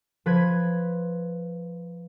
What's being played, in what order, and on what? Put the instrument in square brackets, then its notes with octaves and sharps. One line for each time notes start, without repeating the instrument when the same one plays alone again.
[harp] F3 B4 G#6